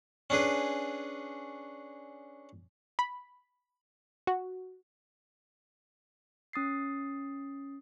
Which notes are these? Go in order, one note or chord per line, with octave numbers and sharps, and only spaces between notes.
C#4 D4 G#4 B4
B5
F#4
C#4 D#6 A6 C7